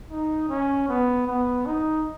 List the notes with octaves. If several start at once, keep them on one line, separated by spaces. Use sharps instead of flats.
D#4
C#4
B3
B3
D#4